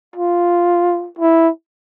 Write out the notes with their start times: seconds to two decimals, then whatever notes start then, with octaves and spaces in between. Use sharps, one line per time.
0.16 F4
1.18 E4